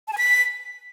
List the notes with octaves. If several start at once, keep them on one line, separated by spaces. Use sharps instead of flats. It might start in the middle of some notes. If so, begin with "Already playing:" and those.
A5
G#5
B6